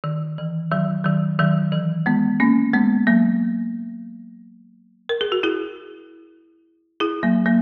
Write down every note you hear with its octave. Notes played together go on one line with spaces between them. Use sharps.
D#3
E3
D#3 F#3
D#3 F#3
D#3 F#3
E3
G#3 B3
A#3 C#4
G#3 B3
F#3 A#3
A#4
G#4
F#4
E4 G#4
E4 G#4
F#3 A#3
F#3 A#3